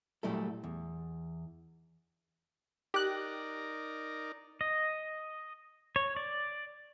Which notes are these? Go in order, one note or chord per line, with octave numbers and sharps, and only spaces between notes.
A#2 F#3 G3 A3 E4 A4
E2
D#4 G4 A#4 D5 F#6
D#5
C#5
D5